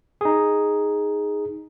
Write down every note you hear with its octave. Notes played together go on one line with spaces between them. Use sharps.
D#4 G#4